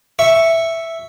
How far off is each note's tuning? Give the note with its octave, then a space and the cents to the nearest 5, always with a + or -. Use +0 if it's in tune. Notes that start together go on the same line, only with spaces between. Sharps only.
E5 +0 C#6 +0